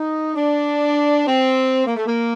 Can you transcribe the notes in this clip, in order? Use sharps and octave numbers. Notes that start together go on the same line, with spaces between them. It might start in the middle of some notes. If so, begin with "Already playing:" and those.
Already playing: D#4
D4
C4
A#3
A3
A#3